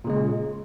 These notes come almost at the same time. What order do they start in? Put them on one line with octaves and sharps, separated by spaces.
A#2 C#3 G#3